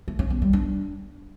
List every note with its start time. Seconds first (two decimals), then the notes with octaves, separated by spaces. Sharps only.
0.08 A3
0.19 C#4
0.30 B3
0.42 G3
0.53 D4